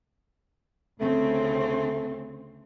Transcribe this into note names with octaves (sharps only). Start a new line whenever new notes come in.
D2 C#3 A3 C4